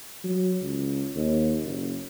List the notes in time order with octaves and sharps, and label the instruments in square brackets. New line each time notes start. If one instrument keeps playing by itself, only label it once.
[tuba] F#3
C#2
D#2
F#1